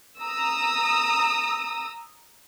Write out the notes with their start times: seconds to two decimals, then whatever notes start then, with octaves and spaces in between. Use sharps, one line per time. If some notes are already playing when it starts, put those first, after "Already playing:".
0.22 A#5 D#6 E6